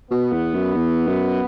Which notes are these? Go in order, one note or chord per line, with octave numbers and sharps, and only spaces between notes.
B2 B3
E2
F#2
E2
F#2